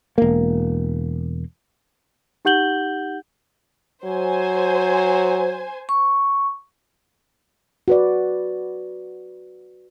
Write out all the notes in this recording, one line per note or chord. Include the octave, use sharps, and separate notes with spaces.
E1 A#3
D#4 G4 F#5 G6 F#7 G7
F#3 C5 G#5
C#6
F#4 B4 D5